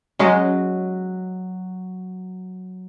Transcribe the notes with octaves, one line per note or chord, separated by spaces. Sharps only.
F#3 G#3 C#4